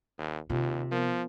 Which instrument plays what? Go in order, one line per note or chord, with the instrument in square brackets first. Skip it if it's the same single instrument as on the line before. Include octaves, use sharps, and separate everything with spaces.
[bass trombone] D#2
[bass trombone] D#2 [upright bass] C3 [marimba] F4
[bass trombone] F3 [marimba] B3 A#4